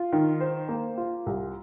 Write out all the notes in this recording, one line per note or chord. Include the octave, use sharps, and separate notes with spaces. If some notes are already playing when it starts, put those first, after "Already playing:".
Already playing: F4
D#3
C5
A#3
F4
C2